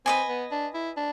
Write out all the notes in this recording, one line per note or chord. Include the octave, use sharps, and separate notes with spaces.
C4 B4 D#5 G#5
B3
D4
E4
D4